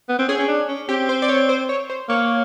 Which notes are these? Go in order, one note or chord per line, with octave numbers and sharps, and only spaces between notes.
B3
C4
C#4 G#4
C#4
D4
C#4
C4 G4
C5
D5
C#5
C5
C#5
C5
A#3 C#5